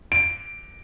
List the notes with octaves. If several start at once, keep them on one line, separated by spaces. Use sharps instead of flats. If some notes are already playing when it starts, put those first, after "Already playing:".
D7